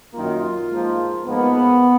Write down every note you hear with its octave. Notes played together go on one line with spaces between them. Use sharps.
F#2 D#3 A#3 F4
G#2 F3 A#3
G#2 F3 A#3 B3